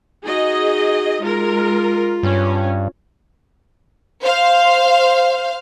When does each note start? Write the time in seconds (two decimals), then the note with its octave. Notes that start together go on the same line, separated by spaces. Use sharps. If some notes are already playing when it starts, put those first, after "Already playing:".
0.25 D#4 F#4 G#4 D#5
1.21 G#3 F4 A#4
2.23 G2 C#4
4.23 C5 F5